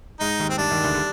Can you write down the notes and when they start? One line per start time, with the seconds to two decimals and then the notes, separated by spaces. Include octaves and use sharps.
0.20 G#2 G#3 D#4
0.39 D#2 D#3
0.49 C4
0.58 G2 D4
0.70 D#2 D#3
0.83 D2 D3
0.96 G3